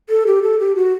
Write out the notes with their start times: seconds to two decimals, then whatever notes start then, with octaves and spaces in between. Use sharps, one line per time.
0.09 A4
0.27 G4
0.43 A4
0.59 G4
0.76 F#4